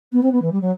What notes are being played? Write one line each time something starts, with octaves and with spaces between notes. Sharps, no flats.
B3
C4
B3
E3
G3
F#3